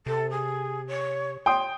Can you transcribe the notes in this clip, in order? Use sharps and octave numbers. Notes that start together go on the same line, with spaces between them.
C3 A4
G#4
C#5
C#5 G5 C6 D#6